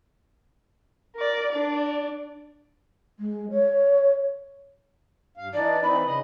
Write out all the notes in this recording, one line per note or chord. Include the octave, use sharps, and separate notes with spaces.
A#4 D5
D4 D5
G#3
C#5
G2 F5
E3 D4 D#4 D5
E3 C4 D#4 B5
C#3 D#5